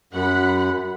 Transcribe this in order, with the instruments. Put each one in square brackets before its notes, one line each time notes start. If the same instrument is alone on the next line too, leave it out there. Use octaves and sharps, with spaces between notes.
[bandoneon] F#2 [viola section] F#5 B5